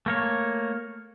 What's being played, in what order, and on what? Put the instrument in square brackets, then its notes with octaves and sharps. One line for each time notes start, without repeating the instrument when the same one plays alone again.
[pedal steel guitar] A3 A#3 C#5